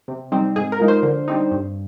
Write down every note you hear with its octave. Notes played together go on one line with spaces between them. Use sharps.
C3
G3 C4 D#4
G#2 G#4
A#4
F3 G#3 D#4
C5
D3
G3 C4 D#4
G2